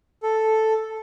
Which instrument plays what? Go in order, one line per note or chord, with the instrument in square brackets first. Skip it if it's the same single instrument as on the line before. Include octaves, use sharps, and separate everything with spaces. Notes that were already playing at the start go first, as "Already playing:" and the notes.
[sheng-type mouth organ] A4